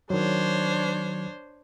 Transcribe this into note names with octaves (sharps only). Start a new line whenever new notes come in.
D#3 F#3 D4 C5 C#5